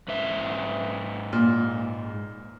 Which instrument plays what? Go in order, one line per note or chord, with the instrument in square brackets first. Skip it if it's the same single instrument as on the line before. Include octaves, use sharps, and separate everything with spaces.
[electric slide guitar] G#2 B4 E5
[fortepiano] A#2